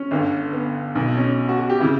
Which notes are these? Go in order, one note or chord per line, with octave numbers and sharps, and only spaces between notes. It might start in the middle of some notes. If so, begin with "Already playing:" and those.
Already playing: C#4
G1 G2 D3
B3
B1 B2 B3
C#4
F#4
F#4
G4
C#3 E3 E4